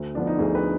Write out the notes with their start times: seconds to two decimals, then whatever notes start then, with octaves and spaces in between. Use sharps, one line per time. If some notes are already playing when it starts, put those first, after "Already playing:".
Already playing: D2
0.14 D3 F3 B3 D4
0.27 D#4
0.39 D2 G#4
0.55 B4